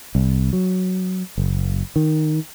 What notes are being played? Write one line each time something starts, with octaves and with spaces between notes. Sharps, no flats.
C2
F#3
F#1
D#3